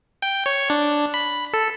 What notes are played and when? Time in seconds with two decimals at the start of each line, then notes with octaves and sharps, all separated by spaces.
0.22 G5
0.46 C#5
0.70 D4
1.14 B5
1.53 A4